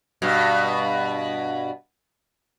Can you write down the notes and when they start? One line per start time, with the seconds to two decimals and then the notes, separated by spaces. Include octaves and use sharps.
0.22 G2 B2